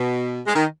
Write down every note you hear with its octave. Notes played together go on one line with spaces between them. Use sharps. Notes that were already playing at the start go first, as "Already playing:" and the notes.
Already playing: B2
G#3
D#3